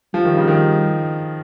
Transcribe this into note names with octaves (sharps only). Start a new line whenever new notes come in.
F3 G3
D#3
C#3
D#3